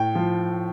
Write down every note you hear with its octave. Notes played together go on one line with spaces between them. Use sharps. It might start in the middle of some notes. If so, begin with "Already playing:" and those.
Already playing: A2 G5
F3